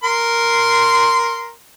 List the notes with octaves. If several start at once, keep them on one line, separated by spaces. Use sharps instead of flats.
A#4 C6